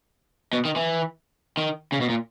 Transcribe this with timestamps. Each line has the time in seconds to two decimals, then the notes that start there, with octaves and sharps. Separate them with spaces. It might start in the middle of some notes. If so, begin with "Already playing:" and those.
0.53 B2
0.65 D#3
0.76 E3
1.57 D#3
1.92 C#3
2.01 B2
2.09 A#2